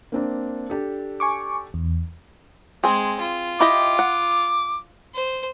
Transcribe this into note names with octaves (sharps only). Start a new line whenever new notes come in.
A#3 C4 D4
D4 G4 A4
G#5 C#6 D6
E2
G#3 C4 G#4
F4
E4 G4 D#5 D6
F#5
C5